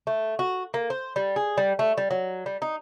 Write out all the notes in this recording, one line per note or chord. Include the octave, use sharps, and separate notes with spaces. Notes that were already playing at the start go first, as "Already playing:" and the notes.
A3
F#4
A#3
C5
G3
G#4
G3
A3
G3
F#3
G3
D#4